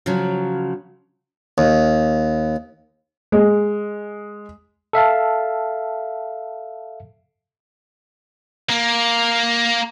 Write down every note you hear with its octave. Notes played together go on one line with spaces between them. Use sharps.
C#3 F3 F#3
D#2
G#3
A4 E5 F5 A5
A#3